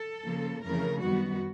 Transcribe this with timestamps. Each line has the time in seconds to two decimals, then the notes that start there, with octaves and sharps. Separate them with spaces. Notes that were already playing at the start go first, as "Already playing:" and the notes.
Already playing: A4
0.23 C#3 F3 A#3
0.62 F2 C#3 E3 A3 A#4
1.01 F#2 D#3 G3 B3 F#4